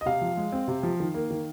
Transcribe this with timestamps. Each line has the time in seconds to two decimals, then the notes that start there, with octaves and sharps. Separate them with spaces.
0.01 D#5
0.06 C3 F5
0.21 F3
0.37 G#3
0.53 C4
0.68 C3
0.83 F3
1.00 D#3
1.15 A#3
1.31 D#3